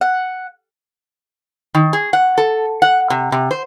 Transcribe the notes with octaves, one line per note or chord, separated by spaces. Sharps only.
F#5
D#3
G#4
F#5
A4
F#5
C3
C3
C5